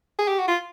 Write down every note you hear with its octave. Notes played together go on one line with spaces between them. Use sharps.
G#4
G4
F#4
F4